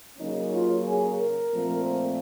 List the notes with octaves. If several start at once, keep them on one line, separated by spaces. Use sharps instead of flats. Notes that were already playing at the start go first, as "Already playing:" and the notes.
C#3 F#3 A#3 C#4 D#4
F4
G#4
A#4
A#2 F3 A3 C4